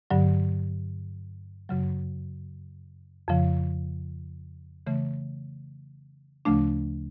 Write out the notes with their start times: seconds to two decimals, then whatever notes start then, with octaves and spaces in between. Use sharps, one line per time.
0.10 G2 D3 F#3
1.69 F#2 C#3 F#3
3.28 F2 C#3 F3
4.87 C#3 E3 A3
6.45 D2 C#3 F3 A3 D4